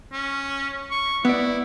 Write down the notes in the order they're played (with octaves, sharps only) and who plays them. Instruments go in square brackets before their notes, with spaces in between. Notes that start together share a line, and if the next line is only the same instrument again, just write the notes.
[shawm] C#4
C#6
[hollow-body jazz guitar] B3 D5 [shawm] E4